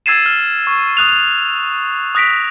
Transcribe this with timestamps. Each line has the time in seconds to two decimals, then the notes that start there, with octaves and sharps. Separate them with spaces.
0.06 E6 G#6 A6 C7 D#7 E7
0.26 F6
0.67 C#6
0.97 D#6 F#6 F7
2.15 D#6 F#6 A#6 B6 D7